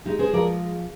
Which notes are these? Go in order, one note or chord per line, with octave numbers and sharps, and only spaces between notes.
G#3 D#4 G4
G#4 C5
F3 A#4 D5